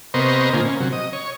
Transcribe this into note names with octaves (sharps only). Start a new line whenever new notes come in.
C3 B3 A#4 C5 D#5 C#6
A#2 D3 A#3 F4 G#5
C#4
C3 F#3
D#5
C#5